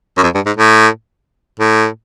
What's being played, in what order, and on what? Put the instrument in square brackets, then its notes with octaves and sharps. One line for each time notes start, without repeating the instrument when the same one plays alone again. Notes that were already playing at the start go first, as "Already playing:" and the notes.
[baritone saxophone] F#2
F2
G2
G#2
A2
A2